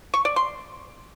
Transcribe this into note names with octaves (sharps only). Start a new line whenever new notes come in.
C#6
D5
C6